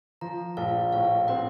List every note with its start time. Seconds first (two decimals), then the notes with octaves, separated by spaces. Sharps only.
0.21 F3 A#5
0.57 A#1 F5
0.92 A2 F5
1.28 C4 F#5